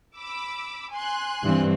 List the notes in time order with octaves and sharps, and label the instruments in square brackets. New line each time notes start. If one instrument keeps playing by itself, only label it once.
[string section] B5 D6 E6
G#5 C6 F#6
[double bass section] G2 [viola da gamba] E3 C4